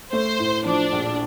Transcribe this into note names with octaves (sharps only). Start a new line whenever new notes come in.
A3 C5
A2
F3 D4
A#1